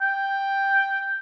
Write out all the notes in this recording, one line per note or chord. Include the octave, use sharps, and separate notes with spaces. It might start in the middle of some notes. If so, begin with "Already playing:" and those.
G5